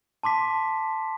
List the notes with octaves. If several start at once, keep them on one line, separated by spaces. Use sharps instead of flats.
A5 C6 D6 B6